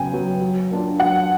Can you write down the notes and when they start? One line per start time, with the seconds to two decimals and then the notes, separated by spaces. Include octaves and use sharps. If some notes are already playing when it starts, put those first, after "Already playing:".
Already playing: C#3 F#3 B3 G5 G#5
0.12 F#3 B3
0.41 F#3
0.71 A#3 D4 F4
1.00 F#3 F#5